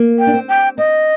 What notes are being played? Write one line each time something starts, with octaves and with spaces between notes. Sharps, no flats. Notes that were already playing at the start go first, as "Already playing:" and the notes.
Already playing: A#3
G5
D4
C4
G5
C4 D#5